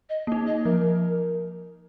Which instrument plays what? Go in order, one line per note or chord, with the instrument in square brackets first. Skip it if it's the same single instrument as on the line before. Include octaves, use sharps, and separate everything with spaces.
[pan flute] D#5
[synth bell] A#3 D#4
[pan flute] D#5
[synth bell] F3 [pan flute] A#4